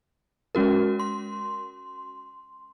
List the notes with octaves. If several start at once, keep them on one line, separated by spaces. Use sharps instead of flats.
G#3 C#4 F#4 A#4
C6